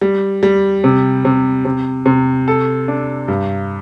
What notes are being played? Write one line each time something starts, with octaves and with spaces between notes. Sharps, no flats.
G3
G3
C3
C3
C3
C3
A4
D4
G2